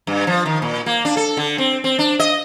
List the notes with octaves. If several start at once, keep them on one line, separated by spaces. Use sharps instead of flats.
G2
F3
D#3
A#2
A#3
D4
A4
D3
C4
C4
D4
D#5